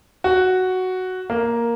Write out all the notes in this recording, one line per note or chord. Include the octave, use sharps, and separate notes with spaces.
F#4
A#3